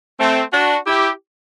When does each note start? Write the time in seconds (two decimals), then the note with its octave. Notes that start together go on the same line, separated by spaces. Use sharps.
0.19 A3 C4
0.53 D4 F#4
0.86 E4 G4